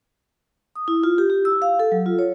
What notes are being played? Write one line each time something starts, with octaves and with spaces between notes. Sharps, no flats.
D#6
E4
F4
G4
G4
E6
F5
A4
F#3
F4
C#5